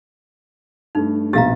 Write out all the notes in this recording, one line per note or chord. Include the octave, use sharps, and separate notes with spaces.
G2 A3 D#4
A#1 B2 G4 F5 A#5 A6